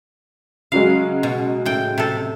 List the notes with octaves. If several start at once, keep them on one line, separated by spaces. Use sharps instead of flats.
C#3 F#3 G#3 F5
B2
A2 G5
C3 A4